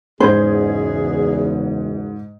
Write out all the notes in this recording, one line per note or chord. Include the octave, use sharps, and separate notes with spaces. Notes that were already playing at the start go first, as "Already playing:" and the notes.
F#1 E2 G#2 G#4 C5 G#6